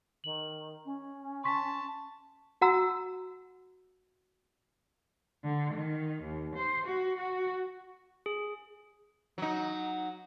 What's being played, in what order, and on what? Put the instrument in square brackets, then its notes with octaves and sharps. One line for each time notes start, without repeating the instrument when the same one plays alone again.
[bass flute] D#3 [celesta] F#7
[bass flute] C#4
[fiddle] A5 [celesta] C6 C#6 B6
[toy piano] F#4 F#5 A#5 E6
[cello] D3
D#3
D#2
C5
F#4
F#4
[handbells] G#4
[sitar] F#3 D#4